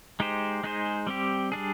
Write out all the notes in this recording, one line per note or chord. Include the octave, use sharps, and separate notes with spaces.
G#3 D#4 G4 C5
G#3 D#4 G#4 C5
G3 C4 G4
G3 D4 G#4